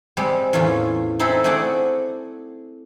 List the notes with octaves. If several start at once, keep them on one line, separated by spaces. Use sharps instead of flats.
G3 G#3 C4
E2 A2 C#4 F4
C4 D#4 E4 G#4 A4
A3 C4 G#4 D5 F#5